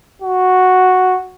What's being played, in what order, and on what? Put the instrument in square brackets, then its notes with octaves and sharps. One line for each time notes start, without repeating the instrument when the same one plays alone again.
[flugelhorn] F#4